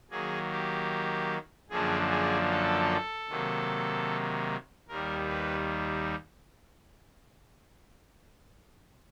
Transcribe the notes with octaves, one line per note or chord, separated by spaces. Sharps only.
D#3 F#3 A#3 G#4
G4
F#2 D3 F3 A#3 D4 G#4
G#4
A4
C3 D#3 F#3 A#3
D#2 D#3 G3 A#4
B4